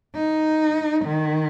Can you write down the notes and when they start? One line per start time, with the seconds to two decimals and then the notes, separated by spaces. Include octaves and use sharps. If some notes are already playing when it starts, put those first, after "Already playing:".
0.15 D#4
1.05 D#3